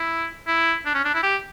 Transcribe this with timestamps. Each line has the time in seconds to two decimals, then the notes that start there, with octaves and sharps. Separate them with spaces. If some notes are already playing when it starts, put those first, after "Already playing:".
Already playing: E4
0.47 E4
0.86 D4
0.94 C#4
1.05 D4
1.14 E4
1.23 G4